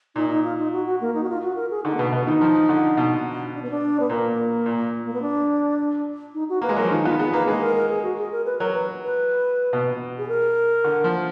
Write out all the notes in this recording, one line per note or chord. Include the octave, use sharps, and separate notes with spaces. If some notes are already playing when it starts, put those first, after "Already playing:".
A#2 D#4
D#4
F4
D#4
F#4
F#4
A#3
D#4
F#4
F4
F#4
A#4
G#4
D3 D#4
A#3
B2 B3
B2 B3
D#3 D#4
F3
D3
B2
D4
B3
D4
B3
A#2 A#3
A#2
A#3
B3
D4
D#4
F#4
A#3 B4
G#3
F#3 A#4
F3
D#3 F4
B3 F4
B3 G#4
A#3 B4
G#3 B4
G#4
A#4
A#4
G#4
F#4
G#4
A#4
B4
F#3 A#4
B4
B4
B2
G#4
A#4
D3
F3